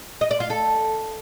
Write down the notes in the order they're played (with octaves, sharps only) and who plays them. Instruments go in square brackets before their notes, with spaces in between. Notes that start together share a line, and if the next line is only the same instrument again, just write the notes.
[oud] D#5
D5
F4
A4